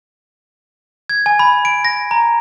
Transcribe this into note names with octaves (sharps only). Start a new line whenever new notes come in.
G#6
G#5
B5
D7
A#6
A#5